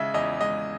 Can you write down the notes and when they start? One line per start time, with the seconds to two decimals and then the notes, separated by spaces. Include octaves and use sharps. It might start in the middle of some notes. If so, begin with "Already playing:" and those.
Already playing: C#3 G#3 E5
0.14 E2 D#5
0.41 G#3 D#5